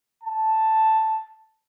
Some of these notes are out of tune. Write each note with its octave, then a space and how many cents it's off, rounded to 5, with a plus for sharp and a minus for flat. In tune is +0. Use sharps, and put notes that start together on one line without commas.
A5 +0